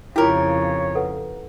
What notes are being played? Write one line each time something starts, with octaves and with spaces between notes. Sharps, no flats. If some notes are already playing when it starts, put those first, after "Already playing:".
F2 C#3 E4 F4 G4 A#4 C#5
A4 B4 F#5